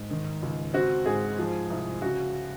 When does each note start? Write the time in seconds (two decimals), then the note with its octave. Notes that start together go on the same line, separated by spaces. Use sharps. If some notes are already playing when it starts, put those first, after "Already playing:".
Already playing: G#2
0.11 D#3
0.43 C#2
0.74 C4 F#4
1.06 G#2 G#4
1.39 F3
1.70 C2
2.02 C#3 F#4